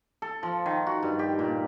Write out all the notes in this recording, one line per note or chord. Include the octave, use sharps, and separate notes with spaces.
A4
F3
D#3
F#4
G2
G4
A#2